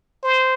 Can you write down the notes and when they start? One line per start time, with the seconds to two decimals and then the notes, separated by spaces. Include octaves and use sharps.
0.24 C5